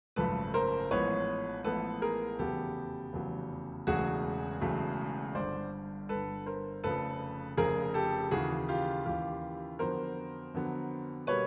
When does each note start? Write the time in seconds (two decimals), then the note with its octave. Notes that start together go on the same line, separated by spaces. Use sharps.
0.16 G#1 F#2 C#3 F3 A3 A4 B4
0.54 A#4 C5
0.91 A1 A2 F3 G#3 B3 B4 C#5
1.64 A1 A2 F3 G#3 B3 A4 B4
2.02 G#4 A#4
2.39 F1 E2 C#3 F#3 B3 G4 A4
3.13 F1 E2 C#3 F#3 B3
3.87 E1 E2 C#3 F#3 A3 F#4 G#4
4.61 E1 E2 C#3 F#3 A3
5.35 G1 G2 D3 C5 D5
6.09 G1 G2 D3 A4 B4
6.46 A#4 C5
6.84 F1 F2 C#3 F3 A4 B4
7.57 F1 F2 C#3 F3 G#4 A#4
7.94 G4 A4
8.31 D#2 C#3 E3 F#4 G#4
8.69 F4 G4
9.06 D#2 C#3 E3 F4 G4
9.79 F2 D3 F#3 B3 A#4 C5
10.54 F2 D3 F#3 B3
11.27 B2 G3 A#3 B4 C#5